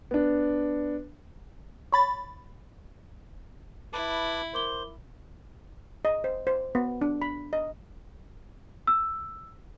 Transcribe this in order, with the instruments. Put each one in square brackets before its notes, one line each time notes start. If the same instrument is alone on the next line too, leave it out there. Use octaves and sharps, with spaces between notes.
[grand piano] B3 D4
[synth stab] C#5 B5 A6
[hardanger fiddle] E4 [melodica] B4 A5 D6
[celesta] A#4 D6 G7 [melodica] C5
[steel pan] D#5
C5
C5
B3
D4
B5
D#5
[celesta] E6